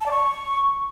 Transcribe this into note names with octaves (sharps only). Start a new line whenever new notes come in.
A5
D5
C#6